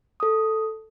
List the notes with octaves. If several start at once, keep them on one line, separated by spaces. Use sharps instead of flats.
A4 D#6